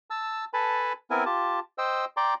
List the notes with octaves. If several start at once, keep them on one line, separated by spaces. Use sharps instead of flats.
A5 E6
A4 B4 G#5 A5 B5
B3 C4 E4 A#4 G#5
F4 G4 A5
C5 D#5 G5 E6
D5 G5 A#5 C6 D6